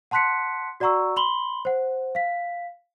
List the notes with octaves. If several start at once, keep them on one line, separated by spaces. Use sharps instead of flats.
F#5 A5 C6 F#6 B6 C#7
F#4 D5 F#5 A#5 C#6 E6
B5 C6 F#7 G7
C5 F#5
F5 B6